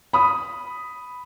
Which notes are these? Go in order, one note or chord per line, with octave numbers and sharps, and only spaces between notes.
B5 D#6